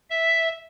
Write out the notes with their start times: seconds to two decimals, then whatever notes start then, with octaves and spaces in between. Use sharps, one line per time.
0.10 E5